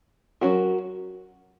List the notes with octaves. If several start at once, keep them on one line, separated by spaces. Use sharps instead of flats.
F#3 C#4 F#4 A#4